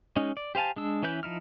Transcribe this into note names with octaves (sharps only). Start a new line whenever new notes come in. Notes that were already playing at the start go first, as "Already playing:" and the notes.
G#3 C#4 D#4
D5
G4 C5 F5 G#5 A5
G#3 D4 E6
E3 C#4 E4 B4 G6
F3 D#4 E4 F6